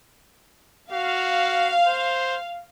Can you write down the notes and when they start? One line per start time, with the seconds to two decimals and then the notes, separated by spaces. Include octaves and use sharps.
0.93 F#4 F5
1.87 C5